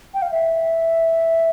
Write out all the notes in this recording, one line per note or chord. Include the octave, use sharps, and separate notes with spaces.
G5
F5
E5